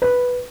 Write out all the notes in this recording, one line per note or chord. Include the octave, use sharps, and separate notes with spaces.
B4